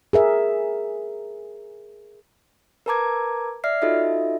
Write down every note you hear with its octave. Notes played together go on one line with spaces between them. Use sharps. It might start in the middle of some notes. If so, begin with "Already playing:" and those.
G#4 A#4 E5
A#4 B4 A5 A#5 D6 G#6
D5 E5 F6 C7
D#4 F4 F#4 A4 D#5 E5